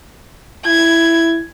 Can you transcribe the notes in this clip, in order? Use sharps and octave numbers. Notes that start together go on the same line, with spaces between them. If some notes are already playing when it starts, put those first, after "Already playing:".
E4 G#6